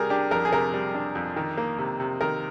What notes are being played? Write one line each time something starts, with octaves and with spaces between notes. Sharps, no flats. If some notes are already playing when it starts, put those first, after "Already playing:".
Already playing: C3 G3 G#4 A#4
D4 G4
F2 A#4
G#4
C3 A#4
G3
D4
F2
D#3
A#3
C3
C3
D#3 A#4